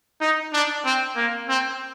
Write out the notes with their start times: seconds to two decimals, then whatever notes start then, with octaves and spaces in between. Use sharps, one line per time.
0.21 D#4
0.53 D4
0.85 C4
1.16 A#3
1.49 C4